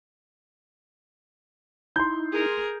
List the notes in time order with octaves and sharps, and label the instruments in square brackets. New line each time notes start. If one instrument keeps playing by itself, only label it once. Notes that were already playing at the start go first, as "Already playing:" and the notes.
[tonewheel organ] D#4 E4 [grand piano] C6 G6
[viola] G#4 A#4